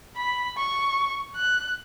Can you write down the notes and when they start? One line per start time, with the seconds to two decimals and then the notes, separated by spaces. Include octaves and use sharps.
0.16 B5
0.58 C#6
1.35 F#6